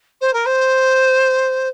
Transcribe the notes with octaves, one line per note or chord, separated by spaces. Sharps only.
C5
A#4
C5